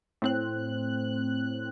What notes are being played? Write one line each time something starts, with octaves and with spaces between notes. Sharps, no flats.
A2 C4 F#6